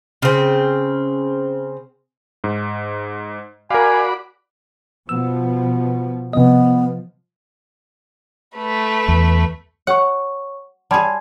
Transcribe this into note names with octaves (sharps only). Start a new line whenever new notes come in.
C#3 C4
G#2
F#4 A#4 D5 F5 G#5 B5
B2 F3 B3 E6
C3 F3 B3 D#5
A3 B4
E2
C#5 F#5 C#6
G3 G#4 A5 C6 G#6